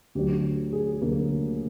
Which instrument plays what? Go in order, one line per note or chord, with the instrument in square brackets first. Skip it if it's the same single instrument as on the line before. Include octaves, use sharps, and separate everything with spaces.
[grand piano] D2 D3 F#3 G4
G#4
D2 D3 F#3 A#3 A#4